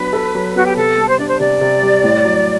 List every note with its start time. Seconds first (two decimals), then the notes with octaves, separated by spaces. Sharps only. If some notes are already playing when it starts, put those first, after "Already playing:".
Already playing: F#3 B3 D4 B4
0.13 A4
0.35 F#3
0.55 B3 F#4
0.66 G4
0.76 C3 A4
0.98 G3
1.09 C5
1.18 D4 D5
1.28 C5
1.40 C3 D5
1.61 C3
1.83 G3
2.04 A2
2.25 F#3